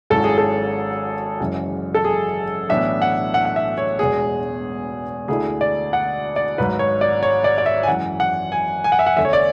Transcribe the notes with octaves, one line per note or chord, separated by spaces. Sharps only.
G#1 G#2 F#3 C#4 E4 A4
G#4
A4
F#1 F#2 E3 G#3
A4
G#4
B1 A2 E3 B3 D4 E5
F#5
F#5
F#5
E5
C#5
E1 E2 B2 G#3 B3 G#4
D2 D3 A3 E4 G#4
D5
F#5
D5
G#1 G#2 F#3 B4
C#5
D5
C#5
D5
D5
E5
G#5
F#2 E3 G#3 F#5
F#5
G#5
G#5
F#5
E5
F#5
E2 D3 A3 E5
C#5
D5